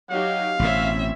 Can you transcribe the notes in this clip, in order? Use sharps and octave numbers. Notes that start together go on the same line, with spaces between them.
F#3 D#4 G4 F5
A1 B2 C4 C#4 E5